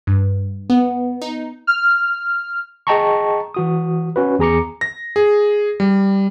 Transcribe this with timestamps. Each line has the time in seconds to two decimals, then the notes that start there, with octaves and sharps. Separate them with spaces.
0.07 G2
0.70 B3
1.22 D#4
1.67 F6
2.87 G#4 D#5 G5 A5 A#5 C#6
3.54 E3 F#4 D#6
4.16 C#4 F#4 B4
4.39 E2 G#4 A#5 D6 C#7
4.81 A#6
5.16 G#4
5.80 G3